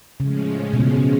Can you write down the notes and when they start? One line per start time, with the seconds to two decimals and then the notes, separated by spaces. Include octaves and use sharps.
0.20 A2 C#3 F3 G#3 C#4
0.73 B2
0.80 C#3
0.96 C#3